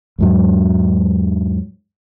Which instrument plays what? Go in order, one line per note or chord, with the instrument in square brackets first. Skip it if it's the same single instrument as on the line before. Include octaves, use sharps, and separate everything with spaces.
[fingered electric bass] E2 G#2 F#3